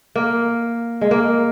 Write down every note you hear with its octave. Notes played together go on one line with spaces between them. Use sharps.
A#3
G#3
A#3